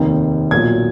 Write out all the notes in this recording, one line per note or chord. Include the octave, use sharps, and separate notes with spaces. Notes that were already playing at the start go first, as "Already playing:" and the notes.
Already playing: F1 D#2 D#3
B1 A#2 F#3 G#6